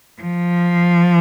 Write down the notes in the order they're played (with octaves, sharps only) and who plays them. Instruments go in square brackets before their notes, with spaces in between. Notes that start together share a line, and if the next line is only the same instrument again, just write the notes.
[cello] F3